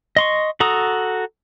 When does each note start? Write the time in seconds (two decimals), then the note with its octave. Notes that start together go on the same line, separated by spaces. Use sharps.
0.16 D#5 C6 C#6
0.60 F#4 A4 A#5 D#6